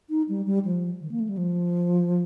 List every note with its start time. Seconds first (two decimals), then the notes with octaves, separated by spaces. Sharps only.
0.10 D#4
0.29 G3
0.46 G3
0.65 F3
1.01 D#3
1.11 A#3
1.20 A3
1.29 G3
1.37 F3